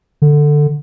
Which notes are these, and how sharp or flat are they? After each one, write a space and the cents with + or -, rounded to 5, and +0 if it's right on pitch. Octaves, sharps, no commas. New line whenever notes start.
D3 +10